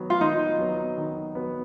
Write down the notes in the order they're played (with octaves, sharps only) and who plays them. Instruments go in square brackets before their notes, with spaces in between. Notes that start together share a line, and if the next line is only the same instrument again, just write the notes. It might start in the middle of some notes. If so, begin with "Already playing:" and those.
Already playing: [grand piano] D#3 F#3 B3
[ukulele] F4
[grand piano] D#3 [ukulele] D#4
[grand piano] F#3 B3
D#3
F#3 B3